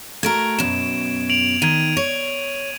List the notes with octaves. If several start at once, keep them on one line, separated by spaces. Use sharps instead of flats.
A3 F#4 A#4 G#6 D7
F#2 B2 E7
D7 F7 F#7
D#3 G#6 D#7
C#5